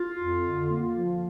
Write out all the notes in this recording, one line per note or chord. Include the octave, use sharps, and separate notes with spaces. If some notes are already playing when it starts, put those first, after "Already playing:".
Already playing: F4
F2
D3
A#3
F3